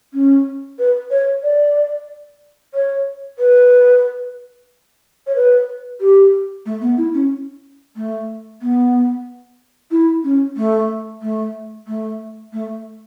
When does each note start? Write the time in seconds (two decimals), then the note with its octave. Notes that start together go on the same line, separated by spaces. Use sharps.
0.13 C#4
0.78 B4
1.10 C#5
1.43 D5
2.74 C#5
3.39 B4
5.26 C#5
5.35 B4
6.00 G4
6.65 A3
6.81 B3
6.97 E4
7.14 C#4
7.96 A3
8.61 B3
9.91 E4
10.23 C#4
10.56 A3
11.22 A3
11.87 A3
12.52 A3